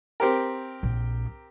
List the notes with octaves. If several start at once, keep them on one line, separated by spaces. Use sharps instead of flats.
C4 G4 A#4
A#1